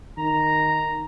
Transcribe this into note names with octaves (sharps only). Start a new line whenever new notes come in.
D#3 A#5